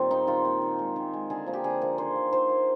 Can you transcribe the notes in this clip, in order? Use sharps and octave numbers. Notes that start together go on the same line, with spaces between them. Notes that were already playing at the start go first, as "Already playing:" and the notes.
Already playing: A#2 D#3 G3 C4 F4
A#3 D#4
D#3 F4
A#3
D#3
G#3
D#3
G#3
D3 G#4
F3 A#3
G4
D3 G#4
F3 A#3
D#3 C5
A#3
D#3 C5
A#3